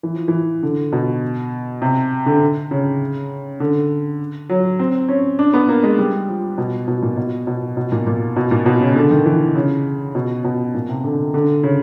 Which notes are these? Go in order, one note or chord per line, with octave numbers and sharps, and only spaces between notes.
E3
F3
E3
D3
B2
C3
D3
C#3
D3
F#3
C4
C#4
D4
B3
A#3
G#3
G3
F3
B2
B2
A#2
B2
B2
B2
A#2
A#2
B2
A#2
B2
C#3
D3
D#3
E3
C#3
B2
B2
A#2
C3
D3
D3
C#3